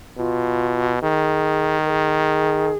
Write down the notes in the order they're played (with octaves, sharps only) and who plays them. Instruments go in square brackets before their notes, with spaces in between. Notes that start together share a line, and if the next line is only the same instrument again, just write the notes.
[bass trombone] B2 [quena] F4
[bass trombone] D#3 [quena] G#4
[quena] A#4
G#4